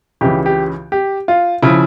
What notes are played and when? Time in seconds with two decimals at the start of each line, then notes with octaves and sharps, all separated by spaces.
0.21 C#2 C#3 E3 G4
0.46 G4
0.92 G4
1.28 F4
1.62 C#3 F3 E4